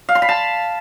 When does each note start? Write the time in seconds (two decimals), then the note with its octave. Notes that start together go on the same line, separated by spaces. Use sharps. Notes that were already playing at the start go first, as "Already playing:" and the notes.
0.09 F5
0.15 C6
0.22 B5
0.29 A5